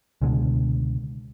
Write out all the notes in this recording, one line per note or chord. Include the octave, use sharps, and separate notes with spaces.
C#2 B2 D3 G#3